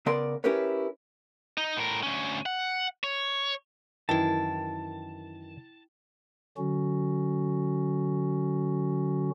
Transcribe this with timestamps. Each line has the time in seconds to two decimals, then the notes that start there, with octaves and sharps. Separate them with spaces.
0.06 C#3 B3 A#4 D5 C6
0.44 C#4 E4 G4 A#4 B4 C#5
1.58 D#4 D#5
1.77 A2 A#4
2.03 D2 C#4
2.46 F#5
3.04 C#5
4.09 F#2 D#3 E3 E4 G5 A5
6.57 D3 F#3 C#4 F#4